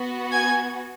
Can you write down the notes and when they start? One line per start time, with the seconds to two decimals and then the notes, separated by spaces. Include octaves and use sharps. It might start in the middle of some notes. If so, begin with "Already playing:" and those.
Already playing: B3 F#4
0.32 G#5 G#6